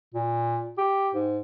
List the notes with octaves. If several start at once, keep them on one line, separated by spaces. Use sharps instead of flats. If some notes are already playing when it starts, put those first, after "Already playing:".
A#2
G4
G#2